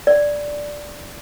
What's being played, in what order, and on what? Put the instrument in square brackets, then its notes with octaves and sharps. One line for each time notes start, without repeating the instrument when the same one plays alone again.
[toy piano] D5